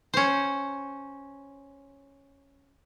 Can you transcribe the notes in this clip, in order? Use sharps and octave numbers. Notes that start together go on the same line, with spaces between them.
C#4 C5